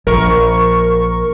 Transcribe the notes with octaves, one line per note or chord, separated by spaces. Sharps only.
A#1 A#4 C#6